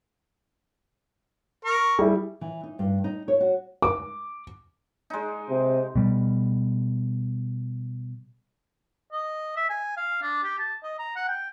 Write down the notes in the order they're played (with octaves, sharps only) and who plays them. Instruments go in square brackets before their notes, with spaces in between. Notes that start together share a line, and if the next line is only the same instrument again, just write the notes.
[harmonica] A#4 C#6
[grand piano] G3 E4 G#4
[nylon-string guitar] E3
D#4
G2
D#4
C#5
F#4
[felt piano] D6
[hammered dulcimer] G#3 D#4
[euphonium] C3
[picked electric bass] B2 G3
[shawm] D#5
E5
G#5
F5
D4
G4
A5
D#5
A#5
F#5
G5